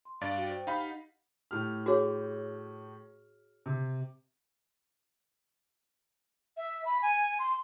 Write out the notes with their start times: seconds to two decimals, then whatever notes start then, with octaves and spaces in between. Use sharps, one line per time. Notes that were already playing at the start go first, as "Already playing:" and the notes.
0.05 C6
0.21 G2 D5 F5 A6
0.37 F#4 G5
0.49 C5 G5
0.67 D#4 G4 F5 B5
0.80 F#5
1.51 A2 G4 F6
1.86 F#4 G#4 C#5
3.66 C3
6.57 E5
6.85 B5
7.02 G#5
7.39 C6